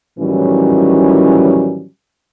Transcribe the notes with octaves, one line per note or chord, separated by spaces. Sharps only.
A2 D#3 E3 F#3 G3 C#4